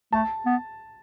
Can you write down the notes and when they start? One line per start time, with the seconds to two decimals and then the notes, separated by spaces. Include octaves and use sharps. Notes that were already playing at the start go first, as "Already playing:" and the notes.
0.12 A3 A5
0.46 B3